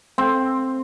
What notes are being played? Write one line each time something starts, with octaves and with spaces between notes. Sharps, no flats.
C4